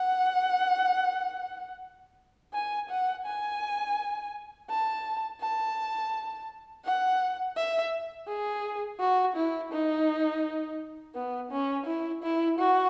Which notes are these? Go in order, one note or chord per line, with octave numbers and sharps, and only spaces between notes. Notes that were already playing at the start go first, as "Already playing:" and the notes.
Already playing: F#5
G#5
F#5
G#5
A5
A5
F#5
E5
G#4
F#4
E4
D#4
B3
C#4
E4
E4
F#4